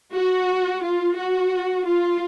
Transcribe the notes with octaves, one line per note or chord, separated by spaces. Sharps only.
F#4
F4
F#4
F4